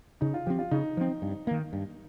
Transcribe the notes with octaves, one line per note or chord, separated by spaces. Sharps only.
C#3 D#4
F4
F3 C4 G4
F4
C#3 D#4
F3 C4
G2
D#3 A#3
G2